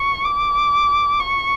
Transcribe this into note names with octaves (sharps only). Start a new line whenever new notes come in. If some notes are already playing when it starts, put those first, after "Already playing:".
Already playing: C#6
D6
C#6